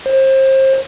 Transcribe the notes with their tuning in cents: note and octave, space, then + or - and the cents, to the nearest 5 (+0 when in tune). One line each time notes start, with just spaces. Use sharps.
C5 +30